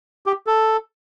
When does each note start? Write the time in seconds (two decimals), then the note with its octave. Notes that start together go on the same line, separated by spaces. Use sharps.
0.26 G4
0.47 A4